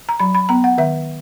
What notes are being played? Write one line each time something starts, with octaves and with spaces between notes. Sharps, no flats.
A#5
F#3 B5
B5
B3 A#5
F#5
D#3 E5